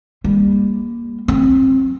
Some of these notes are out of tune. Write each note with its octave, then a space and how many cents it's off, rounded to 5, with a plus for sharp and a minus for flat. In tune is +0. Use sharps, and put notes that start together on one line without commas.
G3 +40 A#3 +15
F#3 +0 C4 +20